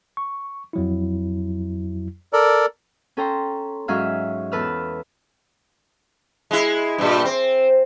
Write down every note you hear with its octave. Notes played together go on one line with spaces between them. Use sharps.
C#6
F2 F#3 E4
A4 A#4 D5
C#4 A4 G5 A#5 C6
G#2 F#3 C#4 E5 F5 F6
E2 E3 A4 B4 E6 F6
G#3 E4
G2 A#2
C4